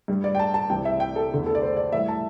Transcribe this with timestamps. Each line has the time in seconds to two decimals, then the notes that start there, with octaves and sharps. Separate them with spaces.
0.08 G2 G3
0.24 D5
0.35 G5
0.39 A5
0.54 A5
0.70 C2 C3 E3 G5
0.85 E5
1.00 G5
1.16 A4
1.31 E2 D3 A3
1.46 A4
1.55 D5
1.62 C5
1.77 D5
1.92 A2 E3 G3 E5
2.08 A5